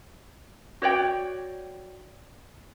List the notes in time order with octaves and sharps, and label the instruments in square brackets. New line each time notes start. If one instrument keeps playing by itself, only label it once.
[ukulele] F#4 C#5 D5 G5